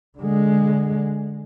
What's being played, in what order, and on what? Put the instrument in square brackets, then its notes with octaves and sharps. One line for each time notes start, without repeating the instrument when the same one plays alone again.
[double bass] D3 G#3